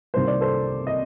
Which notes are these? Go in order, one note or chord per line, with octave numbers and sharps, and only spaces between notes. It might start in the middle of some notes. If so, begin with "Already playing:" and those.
C2 C3 D#3 G3 A#3 C5
D5
A4 C5
D#5